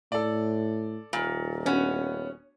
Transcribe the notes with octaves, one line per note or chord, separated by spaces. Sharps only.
A2 A4 D5
D#1 A#2
B3 C#4 F#4